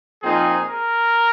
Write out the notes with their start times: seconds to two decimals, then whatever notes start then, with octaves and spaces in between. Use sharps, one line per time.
0.23 A#2 F3 C4 D#4 G#4
0.69 A#4